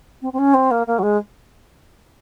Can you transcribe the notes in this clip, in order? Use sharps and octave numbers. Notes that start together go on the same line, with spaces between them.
C4
C4
C#4
C4
A#3
A#3
F#3
G#3